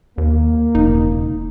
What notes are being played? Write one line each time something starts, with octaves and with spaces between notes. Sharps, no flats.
D#2 A#3
E1 C#3 D#4